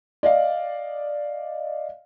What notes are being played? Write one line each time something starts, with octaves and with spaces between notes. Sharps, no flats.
D5 D#5 F5